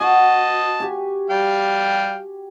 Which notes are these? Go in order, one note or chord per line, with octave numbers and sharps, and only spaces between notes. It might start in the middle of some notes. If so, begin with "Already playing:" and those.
F#4 D#5 A5
G4 G#5
G3 F5 G5